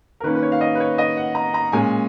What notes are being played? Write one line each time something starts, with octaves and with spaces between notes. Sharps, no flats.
A#4
D#3 A#3 C#4 B4
B4
C#5
F5
D#5
B4
C#5
D#5
F#5
A#5
A#5
A#2 G#3 C#4 G#5